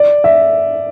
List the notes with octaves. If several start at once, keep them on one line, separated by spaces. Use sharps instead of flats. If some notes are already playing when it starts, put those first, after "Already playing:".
Already playing: D5
E5